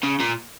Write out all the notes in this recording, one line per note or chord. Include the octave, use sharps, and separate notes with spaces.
C#3
A#2